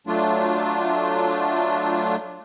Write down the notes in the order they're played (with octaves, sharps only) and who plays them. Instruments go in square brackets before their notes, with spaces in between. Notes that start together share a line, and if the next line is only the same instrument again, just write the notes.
[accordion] F#3 A3 D4 F4